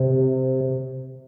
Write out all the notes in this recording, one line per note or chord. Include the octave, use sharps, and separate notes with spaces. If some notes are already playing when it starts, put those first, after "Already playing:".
Already playing: C3